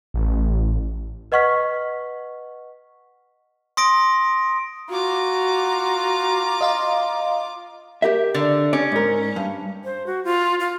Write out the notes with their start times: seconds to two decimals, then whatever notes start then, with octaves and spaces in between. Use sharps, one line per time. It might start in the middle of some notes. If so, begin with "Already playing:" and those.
0.14 A1
1.32 B4 D#5 F#5 C#6 F6 B6
3.77 C6 D#6 A#6 D7
4.90 F4 F#4 A#5 D6
6.61 D#5 F5 C6
8.02 G4 A#4 E5
8.34 D3
8.73 C#4 D5
8.92 G#2 A#4
9.36 G2
9.84 C5
10.07 F#4
10.25 F4
10.60 F4